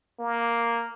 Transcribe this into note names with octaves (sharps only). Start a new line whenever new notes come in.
A#3